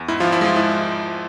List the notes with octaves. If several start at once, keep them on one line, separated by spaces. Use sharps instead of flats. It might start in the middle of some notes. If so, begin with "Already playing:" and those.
Already playing: E2
G#2 E4
G#1 F3 F4
E4
F3 G#3 F4
E4